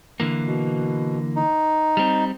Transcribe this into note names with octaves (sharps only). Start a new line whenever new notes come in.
D3 E3 A#3
B2
D#4
G3 C4